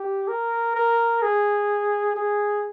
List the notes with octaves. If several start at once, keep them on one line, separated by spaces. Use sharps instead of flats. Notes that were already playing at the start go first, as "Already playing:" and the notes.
Already playing: G4
A#4
A#4
G#4
G#4